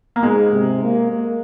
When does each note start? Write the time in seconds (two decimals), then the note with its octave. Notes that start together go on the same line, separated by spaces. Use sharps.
0.16 A#3
0.23 G#2 G#3
0.52 C3
0.83 A#3
1.12 A#3